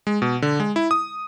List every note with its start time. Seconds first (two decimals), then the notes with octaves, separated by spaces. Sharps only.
0.07 G#3
0.22 B2
0.42 D3
0.60 G#3
0.76 E4
0.91 D#6